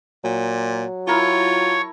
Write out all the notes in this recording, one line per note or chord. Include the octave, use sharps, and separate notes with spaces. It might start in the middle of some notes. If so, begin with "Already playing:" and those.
A#2 F#3
E4 F4 A#4 C#5 A5